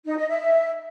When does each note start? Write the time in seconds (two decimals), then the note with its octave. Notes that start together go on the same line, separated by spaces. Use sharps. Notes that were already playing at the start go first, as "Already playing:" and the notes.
0.05 D#4
0.17 D#5
0.28 E5